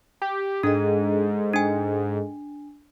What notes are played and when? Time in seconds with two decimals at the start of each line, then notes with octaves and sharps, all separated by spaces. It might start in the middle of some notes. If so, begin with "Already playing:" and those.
0.22 G4
0.63 G#2 D4 G#4 A4 D#5
1.53 D4 G#5